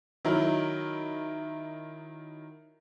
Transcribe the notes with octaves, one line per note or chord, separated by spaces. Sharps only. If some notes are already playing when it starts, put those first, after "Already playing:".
D#3 F#3 E4 A#4